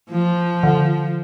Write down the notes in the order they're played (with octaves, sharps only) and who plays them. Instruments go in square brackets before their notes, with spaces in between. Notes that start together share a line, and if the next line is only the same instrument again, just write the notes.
[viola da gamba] F3
[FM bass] D3